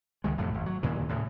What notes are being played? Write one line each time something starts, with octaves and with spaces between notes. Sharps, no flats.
C#2 D#3 G#3
F2 A2 C3 A3
G#1
F#3
D#2 A#2 C#3 E3
A2 C#3